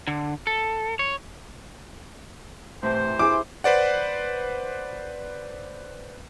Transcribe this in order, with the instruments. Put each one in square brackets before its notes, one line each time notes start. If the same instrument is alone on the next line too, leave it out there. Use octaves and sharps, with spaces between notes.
[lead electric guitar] D3
A4
C#5
[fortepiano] A2 [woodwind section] C3 E3 C5
[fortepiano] E4 G#4 [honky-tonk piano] D6
[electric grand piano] B4 C5 D5 F#5